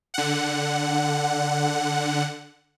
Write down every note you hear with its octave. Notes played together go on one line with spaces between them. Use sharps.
D3 F#5